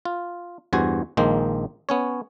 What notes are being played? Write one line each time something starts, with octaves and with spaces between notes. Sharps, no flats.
F4
E2 G2 F#4 C5 G#5
A#1 D#3 G#3 A#3 C5
B3 C#4 C#5